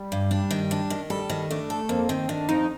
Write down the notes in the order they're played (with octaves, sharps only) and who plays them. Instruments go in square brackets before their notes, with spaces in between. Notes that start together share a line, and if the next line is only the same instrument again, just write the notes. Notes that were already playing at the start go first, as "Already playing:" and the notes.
Already playing: [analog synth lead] G3
[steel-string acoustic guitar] G2
D4
D#3
D4
D#3
[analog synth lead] G3 [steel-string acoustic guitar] A4
[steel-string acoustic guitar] D#3
[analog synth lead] A3 [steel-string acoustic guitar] D4
[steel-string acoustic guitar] A4
[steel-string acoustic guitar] F2 [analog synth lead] A#3
[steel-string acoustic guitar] D#3 [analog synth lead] C4
[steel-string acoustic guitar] D#3 [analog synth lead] D4
[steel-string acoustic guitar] F2 [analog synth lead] D#4